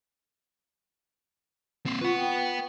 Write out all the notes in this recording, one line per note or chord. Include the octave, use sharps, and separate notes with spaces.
A#3 C4
F4 B4 F#5 C#6
G5